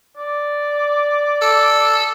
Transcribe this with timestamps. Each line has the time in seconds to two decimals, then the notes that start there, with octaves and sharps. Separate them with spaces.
0.17 D5
1.42 A4